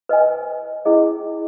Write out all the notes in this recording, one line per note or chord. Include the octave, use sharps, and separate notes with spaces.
B4 D#5 G#5
C#4 E4 G#4 D#5